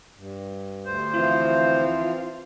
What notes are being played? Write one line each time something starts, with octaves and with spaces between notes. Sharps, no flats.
G2
D2 C5
E3 F3 C4 F4